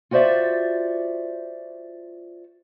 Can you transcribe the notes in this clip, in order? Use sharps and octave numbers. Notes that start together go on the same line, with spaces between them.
F4 F#4 C5 D5 E5